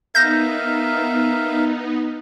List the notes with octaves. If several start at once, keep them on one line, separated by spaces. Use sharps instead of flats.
B3 D#4 A#4 E5 F5 G6 A#6